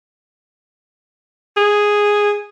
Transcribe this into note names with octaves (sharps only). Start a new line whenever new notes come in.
G#4